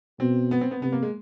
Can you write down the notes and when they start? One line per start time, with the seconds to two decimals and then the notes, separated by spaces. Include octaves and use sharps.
0.20 B2 C4
0.51 B3
0.61 C4
0.71 B3
0.82 C3 B3
0.92 A#3
1.03 G#3